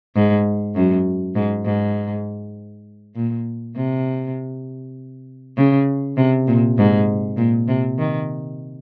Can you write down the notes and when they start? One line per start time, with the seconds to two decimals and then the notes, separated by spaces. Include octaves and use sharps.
0.15 G#2
0.75 F#2
1.35 G#2
1.65 G#2
3.16 A#2
3.76 C3
5.57 C#3
6.17 C3
6.47 A#2
6.78 G#2
7.37 A#2
7.68 C3
7.98 D#3